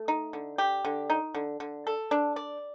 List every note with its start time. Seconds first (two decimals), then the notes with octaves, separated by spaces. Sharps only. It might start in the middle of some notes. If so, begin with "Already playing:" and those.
Already playing: A3
0.08 D#4
0.33 D3
0.58 G4
0.85 D3
1.10 D#4
1.35 D3
1.60 D3
1.87 A4
2.11 D4
2.36 D5